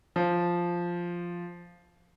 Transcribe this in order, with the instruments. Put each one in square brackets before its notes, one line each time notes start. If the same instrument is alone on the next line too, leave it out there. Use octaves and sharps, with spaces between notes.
[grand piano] F3